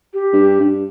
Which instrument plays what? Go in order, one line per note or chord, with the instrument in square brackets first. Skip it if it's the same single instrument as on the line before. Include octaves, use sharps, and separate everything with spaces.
[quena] G4
[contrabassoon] G2
G2